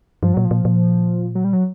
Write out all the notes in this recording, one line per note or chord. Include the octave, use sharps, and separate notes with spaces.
G2 F3
A#2 F#3
F3
A#2
A#2
F#3
G3
F#3